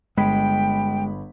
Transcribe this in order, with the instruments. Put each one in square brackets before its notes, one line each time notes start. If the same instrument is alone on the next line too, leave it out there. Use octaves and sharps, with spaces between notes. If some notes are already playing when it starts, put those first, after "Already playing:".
[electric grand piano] G1 B5 B6 [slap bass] G#3 [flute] G5